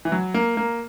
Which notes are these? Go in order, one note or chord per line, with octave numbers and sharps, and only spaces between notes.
E3
F#3
A#3
A#3